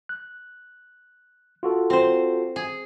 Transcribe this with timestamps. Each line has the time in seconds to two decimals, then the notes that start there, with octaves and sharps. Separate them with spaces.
0.09 F#6
1.63 F4 F#4 A4
1.90 C4 C5
2.56 G#4